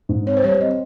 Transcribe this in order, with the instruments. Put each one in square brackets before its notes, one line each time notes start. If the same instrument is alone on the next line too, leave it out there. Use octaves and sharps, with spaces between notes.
[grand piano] G#2
[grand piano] C4 [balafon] C#5
[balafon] C5
[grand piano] G3 [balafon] C#5
[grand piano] C4 [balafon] D#5